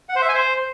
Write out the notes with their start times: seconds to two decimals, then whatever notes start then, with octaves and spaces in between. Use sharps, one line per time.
0.09 F#5
0.16 C5
0.22 E5
0.28 G#5
0.35 C5